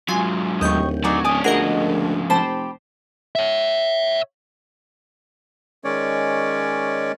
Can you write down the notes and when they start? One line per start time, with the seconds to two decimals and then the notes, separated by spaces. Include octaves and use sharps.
0.08 G#2 F#3 F4 G#5
0.61 D1 D#2 D#5 G5 C#6 G6
1.04 F#3 D#4 D5 G#5
1.25 C#4 D5 G#5 D#6
1.44 D2 G#2 F3 F#4 G#4 A#4 D#5
2.30 F1 G4 C5 A5 B5
3.35 C#5 E5
5.84 D#3 G#3 C#4 C#5 D5